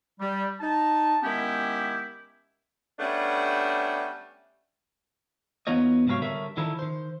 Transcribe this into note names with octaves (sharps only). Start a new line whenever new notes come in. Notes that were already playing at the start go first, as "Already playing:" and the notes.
G3
D#4 A5
D#3 G#3 B3 C#4 E4 G4
G3 A3 B3 C#4 D4
E2 B3 D#4 F4 C#5 D#5
G#2 C3 F#3 A#4 C#5 F5
D3 G3 A#4 C#5 E5
D3 D#3 F3 E4 A4 A#4
D#3 C5